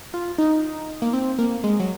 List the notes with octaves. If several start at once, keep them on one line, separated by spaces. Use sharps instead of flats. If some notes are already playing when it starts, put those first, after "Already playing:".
F4
D#4
A#3
C4
A#3
G#3
F#3